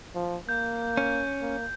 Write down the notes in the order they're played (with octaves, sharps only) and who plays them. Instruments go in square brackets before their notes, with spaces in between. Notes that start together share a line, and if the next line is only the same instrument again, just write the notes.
[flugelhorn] F3
[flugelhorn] A#3 [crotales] G6
[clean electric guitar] C#4
[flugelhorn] A#3